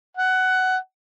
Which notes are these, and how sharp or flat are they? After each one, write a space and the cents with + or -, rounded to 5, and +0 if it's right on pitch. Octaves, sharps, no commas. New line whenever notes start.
F#5 +15